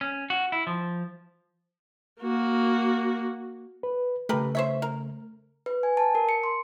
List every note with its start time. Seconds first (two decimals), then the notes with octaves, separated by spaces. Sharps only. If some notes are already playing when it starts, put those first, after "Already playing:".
0.01 C#4
0.30 F#4
0.52 E4
0.67 F3
2.21 A#3 F#4
3.83 B4
4.29 C#3 A3 G4 A#4 B4
4.55 C5 C#5 E5
4.82 A#4
5.66 B4
5.83 G#5
5.97 A5
6.15 A#4
6.29 C#7
6.44 C6